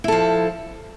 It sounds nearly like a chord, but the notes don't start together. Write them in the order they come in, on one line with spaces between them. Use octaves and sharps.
E4 A4 F3